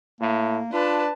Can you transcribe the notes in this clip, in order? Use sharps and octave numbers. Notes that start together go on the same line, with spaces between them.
A2 A#3
D4 F4 B4 A5